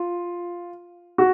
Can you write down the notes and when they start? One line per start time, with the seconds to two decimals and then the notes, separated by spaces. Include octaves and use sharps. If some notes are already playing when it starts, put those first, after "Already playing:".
Already playing: F4
1.18 F#4